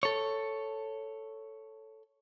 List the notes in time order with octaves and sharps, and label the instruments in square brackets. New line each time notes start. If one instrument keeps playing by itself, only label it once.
[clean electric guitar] A4 C#5